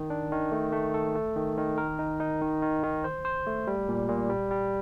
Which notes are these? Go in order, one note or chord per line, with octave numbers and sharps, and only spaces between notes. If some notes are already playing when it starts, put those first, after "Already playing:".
Already playing: D#3
D4
D#3
A3
A3
A4
A3
D#3
D#3
A#4
D#4
D#4
D#3
D#3
D#3
C5
C5
A3
G3
A#2
A#2
G3
G3